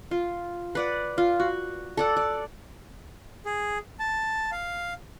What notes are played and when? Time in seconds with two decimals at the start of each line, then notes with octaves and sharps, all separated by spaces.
0.11 F4
0.75 B4 D5 F#5
1.18 F4
1.40 F#4
1.97 A4 D5 F#5
2.17 D5
3.46 G#4
3.99 A5
4.52 F5